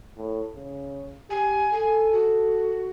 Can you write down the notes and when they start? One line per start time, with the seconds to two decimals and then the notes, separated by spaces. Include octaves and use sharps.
0.17 A2
0.55 C#3
1.30 G4 G#5
1.73 A4 G#5
2.13 F#4